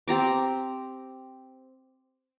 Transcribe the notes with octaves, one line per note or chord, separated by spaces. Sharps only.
C4 G4 A#5 D6